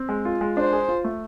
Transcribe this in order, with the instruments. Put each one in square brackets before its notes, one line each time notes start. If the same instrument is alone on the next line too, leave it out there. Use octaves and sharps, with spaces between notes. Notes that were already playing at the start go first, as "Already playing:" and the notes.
Already playing: [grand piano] C4
G#3
F4
G#3
[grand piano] D4 [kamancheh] C5
[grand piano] G#4
F4
A3